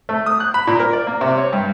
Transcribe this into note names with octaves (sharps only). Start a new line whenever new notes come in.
A3
D#6
F#6
B5
A#2
A#4
D5
A#3
C3
C#5
G2